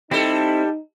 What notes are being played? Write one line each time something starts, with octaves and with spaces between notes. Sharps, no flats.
G3 C4 D#4 E4 A4